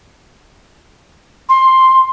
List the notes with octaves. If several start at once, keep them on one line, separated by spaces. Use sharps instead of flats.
C6